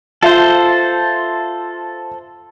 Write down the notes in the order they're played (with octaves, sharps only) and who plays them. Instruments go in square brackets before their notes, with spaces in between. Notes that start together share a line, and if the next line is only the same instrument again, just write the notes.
[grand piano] F4 E5 F5 [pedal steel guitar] A4 C5